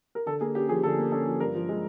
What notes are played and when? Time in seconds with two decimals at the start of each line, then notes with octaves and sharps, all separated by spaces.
0.15 A#4
0.26 D3 A4
0.41 A#3 G#4
0.55 C#4 G4
0.69 F3 G#4
0.83 D3 A4
0.98 A#3
1.12 C#4 A4
1.26 F3
1.40 G2 A#4
1.55 F3
1.69 G#3